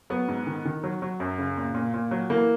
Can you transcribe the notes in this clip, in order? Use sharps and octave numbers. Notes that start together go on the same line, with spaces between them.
F#3 B3
G#2
D#3
D#3
F#3
F#3
F#2
C#3
A#2
A#2
A#2
F#3
E3 A#3